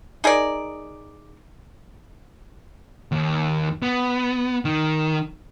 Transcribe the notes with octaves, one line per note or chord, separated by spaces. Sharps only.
D#4 G#4 A#4 D5
D#2
B3
D#3